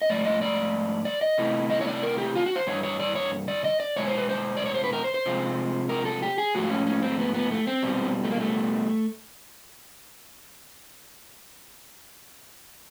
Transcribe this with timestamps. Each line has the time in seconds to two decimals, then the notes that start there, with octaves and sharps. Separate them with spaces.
0.02 D#5
0.09 G#2 F3 A3 D5
0.25 D#5
0.42 D5
1.05 D5
1.21 D#5
1.38 C3 E3 A3
1.70 D#5
1.81 C#5
1.87 D5
2.03 A#4
2.18 G4
2.35 F4
2.46 F#4
2.56 C5
2.67 G2 E3 C#5
2.83 C#5
2.99 D5
3.15 C#5
3.48 D5
3.64 D#5
3.80 D5
3.96 E2 B2 G#3 C#5
4.07 C5
4.18 B4
4.29 C5
4.57 D5
4.66 C#5
4.74 C5
4.84 B4
4.93 A#4
5.04 C5
5.14 C5
5.25 C3 F3 G#3
5.89 A#4
6.05 A4
6.22 G4
6.38 G#4
6.55 G#2 F3 A3 F#4
6.70 C#4
6.86 C#4
7.02 C4
7.19 B3
7.34 B3
7.51 A3
7.67 C4
7.83 E2 B2 G3
8.24 A3
8.31 A#3
8.40 A3